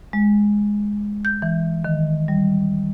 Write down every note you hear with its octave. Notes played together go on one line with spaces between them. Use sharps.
G#3
G6
E3
D#3
G3